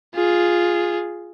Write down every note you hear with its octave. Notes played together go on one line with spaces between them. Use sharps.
F4 G#4